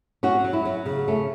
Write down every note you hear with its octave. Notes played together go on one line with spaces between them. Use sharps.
F#3 C#4 F#4
F#3
E4
F#3 C#4
C#3
A3 C#4